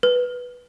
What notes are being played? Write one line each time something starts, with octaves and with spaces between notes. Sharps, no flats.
B4